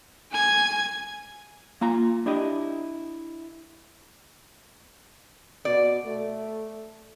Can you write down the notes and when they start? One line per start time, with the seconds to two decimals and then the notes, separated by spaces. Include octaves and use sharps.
0.31 G#5 G#6
1.81 A#3 F4 A#5
2.26 D4 E4 G4 D#5
5.65 B2 D5
6.05 A3